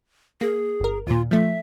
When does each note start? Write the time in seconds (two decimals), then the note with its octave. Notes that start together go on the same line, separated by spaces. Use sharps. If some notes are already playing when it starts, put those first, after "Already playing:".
0.41 A#3 G#4
0.80 G1 A#4
1.07 D#2 A#2 F4
1.31 F3 A3 E5